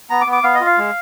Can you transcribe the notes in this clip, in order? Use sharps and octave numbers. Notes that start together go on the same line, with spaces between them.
B3 A#5
D6
B3
D6
B3 F5
D#5
F4
F5
G#3